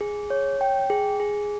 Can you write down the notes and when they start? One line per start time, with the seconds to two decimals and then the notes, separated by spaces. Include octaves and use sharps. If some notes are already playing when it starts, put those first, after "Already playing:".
0.01 G#4
0.30 C#5
0.61 G5
0.90 G#4
1.20 G#4